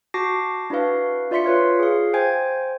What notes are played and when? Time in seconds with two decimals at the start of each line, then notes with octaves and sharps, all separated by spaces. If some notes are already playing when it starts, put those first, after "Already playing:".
0.14 F#4 A5 D6 A#6 C7
0.70 D4 E4 F#4 B4 F5
1.31 F4 D5 E5 C6 B6 C#7
1.44 F4 B4 C#5 F5
1.79 G#4 F5
2.13 C5 G5 G#5 G#6